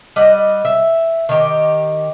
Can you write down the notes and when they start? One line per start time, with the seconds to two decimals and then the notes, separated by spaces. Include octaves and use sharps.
0.16 G3 D#5 F#5
0.65 E5
1.29 D#3 G4